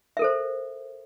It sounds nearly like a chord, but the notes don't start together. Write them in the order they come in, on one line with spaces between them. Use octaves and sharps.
E5 A#4 A4 C5